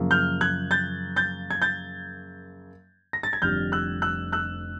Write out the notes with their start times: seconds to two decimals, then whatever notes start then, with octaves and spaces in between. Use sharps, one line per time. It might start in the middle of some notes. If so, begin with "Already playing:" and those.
Already playing: F#2 C#3 F3 A#3
0.11 F6 G6
0.41 F#6 G#6
0.71 G6 A6
1.16 G6 A6
1.50 G#6
1.62 G6 A6
3.13 A#6
3.23 A6
3.33 G#6
3.42 F1 F2 D3 G3 F6 G6
3.72 E6 F#6
4.02 E6 F#6
4.32 E6 F#6